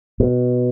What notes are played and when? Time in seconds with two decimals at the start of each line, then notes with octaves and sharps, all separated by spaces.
0.20 B2